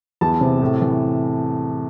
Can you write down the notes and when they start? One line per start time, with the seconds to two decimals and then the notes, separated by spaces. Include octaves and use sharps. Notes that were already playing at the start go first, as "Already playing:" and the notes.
0.21 E2 A5
0.41 C3
0.61 A2
0.81 E3